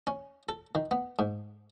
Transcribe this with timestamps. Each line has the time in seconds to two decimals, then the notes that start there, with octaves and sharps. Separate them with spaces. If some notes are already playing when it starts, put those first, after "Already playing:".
0.07 C#4
0.49 A4
0.75 D#3
0.91 B3
1.19 G#2